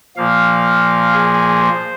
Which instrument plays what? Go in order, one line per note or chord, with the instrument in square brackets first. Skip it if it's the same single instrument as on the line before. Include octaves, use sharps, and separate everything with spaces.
[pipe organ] A#2 F3 A#3 F5
G#4
C5